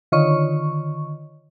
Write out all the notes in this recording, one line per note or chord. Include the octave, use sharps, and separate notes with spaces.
D3 D#3 F4 C#5 D#5 C#6